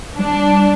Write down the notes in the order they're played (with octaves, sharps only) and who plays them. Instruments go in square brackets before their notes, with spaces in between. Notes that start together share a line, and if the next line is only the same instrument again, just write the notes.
[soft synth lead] G3 [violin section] D4